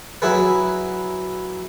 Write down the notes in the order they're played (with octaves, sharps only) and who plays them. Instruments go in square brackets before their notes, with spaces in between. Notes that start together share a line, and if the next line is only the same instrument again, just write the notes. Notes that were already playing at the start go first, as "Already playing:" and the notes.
[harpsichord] F#3 E4 G#4 B4